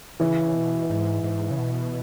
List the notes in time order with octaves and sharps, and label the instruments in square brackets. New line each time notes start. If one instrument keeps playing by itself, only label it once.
[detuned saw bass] C#3 [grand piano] E3
[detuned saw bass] B2
G#2
G#2
C#3
B2